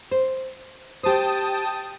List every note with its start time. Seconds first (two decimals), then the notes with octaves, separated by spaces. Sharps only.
0.11 C5
1.03 G4 C5 G5 A5 D#6